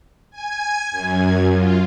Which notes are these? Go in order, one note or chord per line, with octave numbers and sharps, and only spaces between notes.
G#5 G#6
F#2
F4